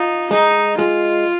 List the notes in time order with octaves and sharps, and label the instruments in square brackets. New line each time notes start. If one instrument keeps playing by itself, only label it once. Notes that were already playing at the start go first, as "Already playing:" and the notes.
Already playing: [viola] D#4 [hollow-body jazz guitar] F4
[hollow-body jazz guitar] G#3 [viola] D#4
[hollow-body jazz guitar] G#3 [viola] F4